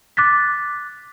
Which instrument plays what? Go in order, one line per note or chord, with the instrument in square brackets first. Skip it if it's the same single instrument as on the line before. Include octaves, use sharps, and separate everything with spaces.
[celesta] D6 F#6 A6 B6